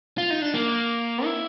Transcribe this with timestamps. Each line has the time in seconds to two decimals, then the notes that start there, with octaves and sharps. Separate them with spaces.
0.18 F4
0.30 D#4
0.42 D4
0.54 A#3
1.25 E4